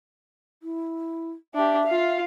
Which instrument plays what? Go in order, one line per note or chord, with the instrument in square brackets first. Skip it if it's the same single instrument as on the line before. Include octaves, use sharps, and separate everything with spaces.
[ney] E4
[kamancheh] D4 G4 [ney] E5
[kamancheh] F4 F5